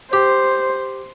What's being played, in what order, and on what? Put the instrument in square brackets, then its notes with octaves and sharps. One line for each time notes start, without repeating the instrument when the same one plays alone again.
[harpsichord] G4 [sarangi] C5